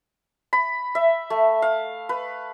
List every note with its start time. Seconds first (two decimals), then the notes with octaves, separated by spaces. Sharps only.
0.53 B5
0.95 E5
1.30 A3
1.62 F5
2.09 B4